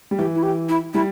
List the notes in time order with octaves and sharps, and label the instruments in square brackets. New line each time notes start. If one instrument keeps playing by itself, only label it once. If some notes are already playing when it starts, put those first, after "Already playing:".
[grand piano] G3
[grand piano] E3 [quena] G4
[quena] E4
G4
E4
[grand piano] G3 [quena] E4